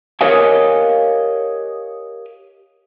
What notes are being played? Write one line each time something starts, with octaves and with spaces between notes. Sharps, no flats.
G4 A#4 C#5 D#5 F5 G#5